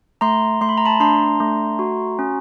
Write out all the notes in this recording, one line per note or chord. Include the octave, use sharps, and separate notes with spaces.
A3 A#5 C6
A3 C6
B5
A#5
A5 B5
D4 A#5 C6
A3
F#4
C#4